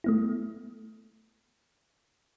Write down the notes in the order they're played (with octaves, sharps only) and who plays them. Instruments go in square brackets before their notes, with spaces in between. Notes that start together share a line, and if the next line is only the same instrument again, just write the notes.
[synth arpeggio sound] A3 B3 E4